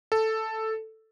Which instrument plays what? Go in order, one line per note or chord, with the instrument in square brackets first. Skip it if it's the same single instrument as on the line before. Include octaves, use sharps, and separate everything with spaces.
[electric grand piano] A4